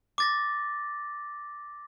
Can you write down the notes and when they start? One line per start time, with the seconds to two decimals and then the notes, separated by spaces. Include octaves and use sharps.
0.18 D6 A6 A#6